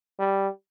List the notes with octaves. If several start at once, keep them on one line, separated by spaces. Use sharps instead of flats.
G3